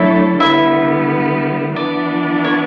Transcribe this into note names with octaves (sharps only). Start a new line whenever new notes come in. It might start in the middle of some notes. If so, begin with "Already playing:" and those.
Already playing: F#3 A3 D4 E4 A4 C#5 E5
D3 G3 B3 E4 E5
E3 B3 D4 D5
C#5